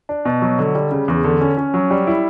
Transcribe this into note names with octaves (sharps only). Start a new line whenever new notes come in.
D4
B2
F#3
D3
G3
C#3
E2
D3
C#4
C#4
F#3
G3
E4